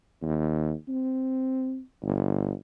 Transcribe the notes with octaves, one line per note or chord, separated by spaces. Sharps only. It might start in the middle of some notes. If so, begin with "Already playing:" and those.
D#2
C4
G1